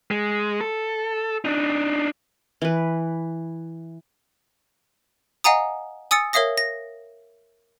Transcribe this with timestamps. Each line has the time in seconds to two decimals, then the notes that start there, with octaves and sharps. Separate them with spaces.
0.11 G#3
0.61 A4
1.45 D4 D#4
2.62 E3 B4
5.44 D#5 F5 F#5 G#5 A#5 D#6
6.11 G#5 D#6 E6 A6 C#7
6.33 A#4 C#5 E5 F5 D#6 A#6
6.58 A#6